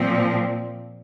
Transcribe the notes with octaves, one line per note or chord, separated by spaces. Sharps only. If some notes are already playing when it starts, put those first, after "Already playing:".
Already playing: A#2 F3 C4